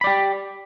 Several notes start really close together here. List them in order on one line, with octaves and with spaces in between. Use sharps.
B5 D5 G4